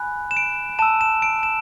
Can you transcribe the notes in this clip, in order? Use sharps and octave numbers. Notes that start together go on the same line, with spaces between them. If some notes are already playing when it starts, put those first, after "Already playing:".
Already playing: G#5 B5 F#6
E7
D7
A5 E6 E7
E7
D7
E7